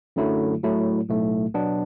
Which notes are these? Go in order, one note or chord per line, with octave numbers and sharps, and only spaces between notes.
F#2 D3 F#3 A3 E4
A2 F#3 A3 E4
B1 A2 A3
B2 F#3 B3 D4